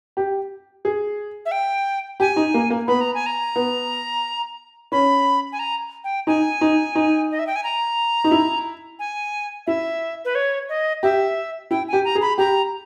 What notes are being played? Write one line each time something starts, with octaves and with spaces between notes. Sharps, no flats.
G4
G#4
E5
G5
G4 G#5
D#4
A#3
A#3
B3 B5
A#5
G#5
A#5
B3
C#4 B5
G#5
A#5
G5
D#4 G#5
D#4
D#4
D#5
E5
G5
G#5
A#5
D#4
E4
G#5
E4 E5
B4
C#5
D#5
G4 E5
E4 G5
G4 G#5
A#5
G#4
B5
G4 A#5